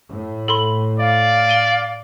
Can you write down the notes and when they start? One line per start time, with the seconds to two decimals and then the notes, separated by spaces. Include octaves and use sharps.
0.10 A2
0.48 A4 B5 C6
0.99 D5 F5
1.49 D#7 G7